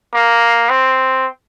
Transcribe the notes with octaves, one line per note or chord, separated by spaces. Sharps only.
A#3
C4